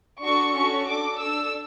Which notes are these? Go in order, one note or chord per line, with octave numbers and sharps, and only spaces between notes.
D4 F#4 A4 C#6
C#4 F#4 A4 C#6
D4 A4 D6
D4 A4 E6